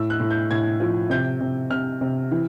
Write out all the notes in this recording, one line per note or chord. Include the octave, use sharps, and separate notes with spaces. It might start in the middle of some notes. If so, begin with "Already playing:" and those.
Already playing: A2 E6
F#6
A2
G6
A2 G#6
F3
C3 G6
C3
C3 F6
C3
E3